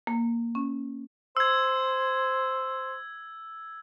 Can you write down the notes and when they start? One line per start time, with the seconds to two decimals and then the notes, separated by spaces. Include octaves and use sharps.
0.07 A#3
0.55 C#4
1.37 C5 E6 G#6